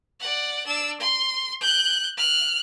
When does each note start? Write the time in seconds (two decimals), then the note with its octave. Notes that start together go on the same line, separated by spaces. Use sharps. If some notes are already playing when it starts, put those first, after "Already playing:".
0.20 D5 F#5
0.67 D4 E6
1.00 C6
1.61 F#6 G6
2.17 F6 F#6